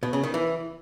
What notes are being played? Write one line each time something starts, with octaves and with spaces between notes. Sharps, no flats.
B2
C#3
D#3
E3